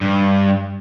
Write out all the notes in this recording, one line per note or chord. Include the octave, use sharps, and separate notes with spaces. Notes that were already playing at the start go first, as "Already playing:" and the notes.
G2